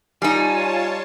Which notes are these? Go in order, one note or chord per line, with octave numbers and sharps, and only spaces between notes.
G3 D#4 F4 C#5 G#5 A5